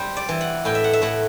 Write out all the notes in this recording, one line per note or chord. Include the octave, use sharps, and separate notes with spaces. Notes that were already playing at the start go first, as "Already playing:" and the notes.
Already playing: G3 C5
D5
E3
F#5
A2 G5
E5
F#5
E5
A2 F#5